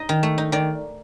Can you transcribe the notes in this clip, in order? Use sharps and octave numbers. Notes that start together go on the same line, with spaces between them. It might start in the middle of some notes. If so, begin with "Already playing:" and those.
Already playing: D#4 D#5
D#3
A3
D#4
D#3 D5